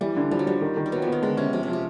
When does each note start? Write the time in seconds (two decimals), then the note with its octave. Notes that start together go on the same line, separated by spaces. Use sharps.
0.01 E3 G3
0.17 D3
0.31 F3 G3
0.39 F#3
0.47 F3 G3
0.61 D#3
0.77 D#3
0.86 G3
0.92 F#3 B3
1.02 F3
1.08 D#3 B3
1.22 D3 G#3
1.37 C3 C#4
1.53 C3 F3
1.63 C3
1.68 F3
1.73 C3